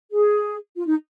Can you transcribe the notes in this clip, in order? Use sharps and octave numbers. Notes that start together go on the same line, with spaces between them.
G#4
F4
D#4